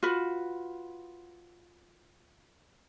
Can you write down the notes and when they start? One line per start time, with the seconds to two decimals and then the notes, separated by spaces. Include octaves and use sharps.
0.03 F4 F#4 B4